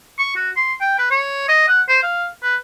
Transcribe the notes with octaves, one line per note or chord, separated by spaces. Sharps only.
C#6
F#4
C6
G5
B4
C#5
D#5
F#5
C5
F5
B4